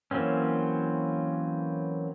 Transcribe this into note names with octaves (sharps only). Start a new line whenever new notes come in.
E3 F#3 A#3 C4 C#4